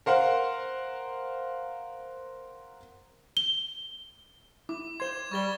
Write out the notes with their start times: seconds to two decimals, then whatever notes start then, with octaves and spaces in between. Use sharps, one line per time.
0.06 A#4 C5 F5 F#5
3.37 G7
4.69 E4 D6
5.00 C5 C6 G#6 E7
5.32 G3 C#6 A6 G7